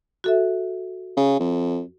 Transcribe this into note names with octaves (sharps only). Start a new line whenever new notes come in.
F#4 A4 E5
C#3
F2